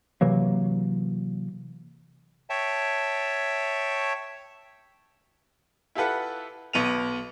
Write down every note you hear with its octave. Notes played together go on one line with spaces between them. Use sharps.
C3 E3 F#3 A#3
C#5 E5 G5 A5
E4 F4 G4 A4 B4 F#5
B1 B3 D#7 F7